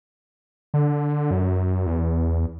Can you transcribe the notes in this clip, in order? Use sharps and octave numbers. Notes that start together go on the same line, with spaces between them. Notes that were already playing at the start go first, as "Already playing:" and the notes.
D3
F#2
E2